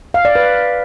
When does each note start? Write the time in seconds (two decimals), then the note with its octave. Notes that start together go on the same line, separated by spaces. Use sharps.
0.14 F5
0.25 D5
0.35 B4